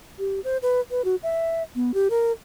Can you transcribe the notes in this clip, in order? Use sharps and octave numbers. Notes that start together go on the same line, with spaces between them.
G4
C5
B4
B4
F#4
E5
B3
G4
A#4